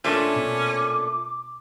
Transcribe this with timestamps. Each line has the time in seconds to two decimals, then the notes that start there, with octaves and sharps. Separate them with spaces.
0.04 A#2 A3 C#4 D4 D6
0.36 B2